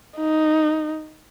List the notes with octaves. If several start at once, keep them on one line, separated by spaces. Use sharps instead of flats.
D#4